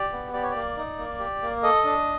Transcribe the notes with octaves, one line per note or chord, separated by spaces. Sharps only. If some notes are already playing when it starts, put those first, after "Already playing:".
Already playing: G4 D5
B3
G4 D5
C#5
A#3 D5
D#4
A#3
G4
A#3
A4 D#5
D4